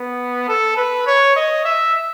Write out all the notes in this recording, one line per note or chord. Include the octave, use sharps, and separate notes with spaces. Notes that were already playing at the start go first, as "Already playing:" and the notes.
Already playing: B3
A4
B4
C#5
D#5
E5